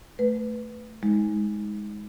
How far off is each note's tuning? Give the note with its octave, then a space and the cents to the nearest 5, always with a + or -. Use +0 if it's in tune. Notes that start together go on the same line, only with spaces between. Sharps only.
A3 +0 B4 +5
G#3 +0 D#4 +35